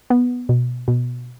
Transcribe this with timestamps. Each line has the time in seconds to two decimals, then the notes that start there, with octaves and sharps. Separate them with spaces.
0.10 B3
0.49 B2
0.88 B2